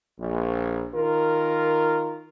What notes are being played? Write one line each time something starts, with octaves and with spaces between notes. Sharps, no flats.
A#1
D#3 F4 A#4